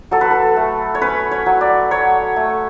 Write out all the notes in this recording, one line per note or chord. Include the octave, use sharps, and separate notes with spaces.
F#3 A4
B4
A4
A3
C#5
C#4 B4
C#5
F#3
D5
F#3 C#5
A3